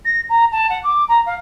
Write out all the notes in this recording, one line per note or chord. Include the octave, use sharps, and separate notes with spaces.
A#6
A#5
A5
F#5
D6
A#5
F5